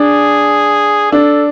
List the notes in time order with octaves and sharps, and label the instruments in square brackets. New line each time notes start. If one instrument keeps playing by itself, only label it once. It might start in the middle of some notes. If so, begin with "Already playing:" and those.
Already playing: [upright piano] D4 [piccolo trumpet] G#4
[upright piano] D4 [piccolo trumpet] A4